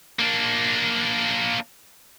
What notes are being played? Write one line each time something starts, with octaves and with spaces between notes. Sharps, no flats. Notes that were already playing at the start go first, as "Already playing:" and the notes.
A#3 D4